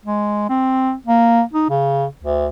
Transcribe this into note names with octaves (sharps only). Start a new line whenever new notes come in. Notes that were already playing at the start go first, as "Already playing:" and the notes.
G#3
C4
A#3
D#4
C#3
D2